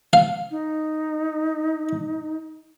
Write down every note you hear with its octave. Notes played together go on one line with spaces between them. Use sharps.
F5
D#4